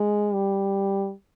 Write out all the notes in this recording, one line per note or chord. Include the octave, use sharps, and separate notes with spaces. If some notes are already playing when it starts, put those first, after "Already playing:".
Already playing: G#3
G3